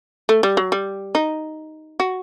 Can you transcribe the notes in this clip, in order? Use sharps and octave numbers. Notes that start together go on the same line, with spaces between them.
A3
G3
F#3
G3
D#4
F#4